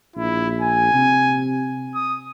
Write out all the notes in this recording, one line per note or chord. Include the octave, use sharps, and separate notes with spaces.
A#1 E4
G#5
C3
D#6